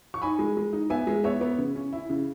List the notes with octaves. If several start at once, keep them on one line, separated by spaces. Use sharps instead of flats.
C#6
D#4 G#5 B5
G#3
G#3
D#4
B3 E5 G#5
G#3
B3 C#5 E5
B3
C#3
C#4
E4
C#3